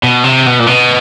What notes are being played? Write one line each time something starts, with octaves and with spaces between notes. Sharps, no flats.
B2
C3
B2
A#2
B2